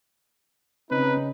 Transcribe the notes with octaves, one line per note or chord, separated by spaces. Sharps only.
C#3 C4 C#4 D#4 B4